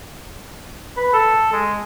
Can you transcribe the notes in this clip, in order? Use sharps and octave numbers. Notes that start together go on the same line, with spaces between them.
B4
A4
G#3